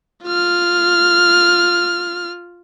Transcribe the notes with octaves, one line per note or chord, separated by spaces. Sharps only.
F4 F6